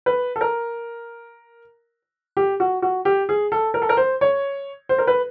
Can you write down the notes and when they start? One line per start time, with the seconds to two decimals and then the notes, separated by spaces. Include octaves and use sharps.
0.06 B4
0.36 A4
0.41 A#4
2.37 G4
2.60 F#4
2.82 F#4
3.05 G4
3.29 G#4
3.52 A4
3.74 A#4
3.82 A4
3.89 A#4
3.97 C5
4.21 C#5
4.89 C5
4.98 A#4
5.07 B4